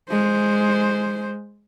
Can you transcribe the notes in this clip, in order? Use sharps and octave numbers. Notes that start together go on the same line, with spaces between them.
G#3 C5